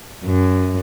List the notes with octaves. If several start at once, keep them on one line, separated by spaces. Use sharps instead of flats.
F#2